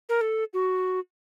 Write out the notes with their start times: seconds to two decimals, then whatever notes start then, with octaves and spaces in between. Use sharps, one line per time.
0.09 A#4
0.21 A4
0.54 F#4